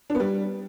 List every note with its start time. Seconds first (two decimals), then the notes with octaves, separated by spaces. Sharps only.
0.10 D4
0.15 B3
0.20 G3